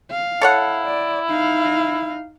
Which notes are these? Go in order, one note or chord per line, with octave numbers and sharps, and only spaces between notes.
F5
E4 A4 C#5 F#5
D5
D#4 F5